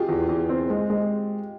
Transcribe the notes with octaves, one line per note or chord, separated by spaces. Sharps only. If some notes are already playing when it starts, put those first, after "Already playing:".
Already playing: F4 G4 G#4
E2
E2
C4
G#3
G#3